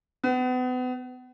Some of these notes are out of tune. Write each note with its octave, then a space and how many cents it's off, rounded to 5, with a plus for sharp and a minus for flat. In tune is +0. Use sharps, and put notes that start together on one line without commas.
B3 +35